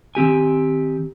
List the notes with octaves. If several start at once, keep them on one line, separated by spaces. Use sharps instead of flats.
D#3 C4 G4 G#5